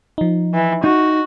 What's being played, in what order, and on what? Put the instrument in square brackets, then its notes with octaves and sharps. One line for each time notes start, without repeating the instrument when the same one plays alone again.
[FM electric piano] F3 D#4
[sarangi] E3
[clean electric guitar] D#4 [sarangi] F#4